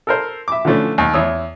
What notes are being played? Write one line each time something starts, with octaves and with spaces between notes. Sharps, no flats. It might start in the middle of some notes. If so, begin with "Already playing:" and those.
A4 A#4 C5
E5 D6
D3 E3 F3 A3 C#4 D4
D#2
E2 C#5 D#6 E6